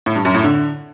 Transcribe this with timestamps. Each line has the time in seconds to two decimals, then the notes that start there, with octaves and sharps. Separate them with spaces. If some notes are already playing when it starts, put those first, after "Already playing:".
0.06 A2
0.16 G2
0.25 F#2
0.34 A2
0.44 D3